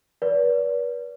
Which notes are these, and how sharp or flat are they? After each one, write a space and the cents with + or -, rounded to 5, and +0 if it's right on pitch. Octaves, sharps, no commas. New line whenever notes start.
B4 -30 D5 -35